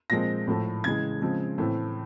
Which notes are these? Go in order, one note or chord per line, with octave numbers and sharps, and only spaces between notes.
A#2 F3 G#3 C4 A#6
A2 F3 A3
C#3 E3 G#3 G#6
C#3 F3 G#3 C4
A2 E3 A3 C4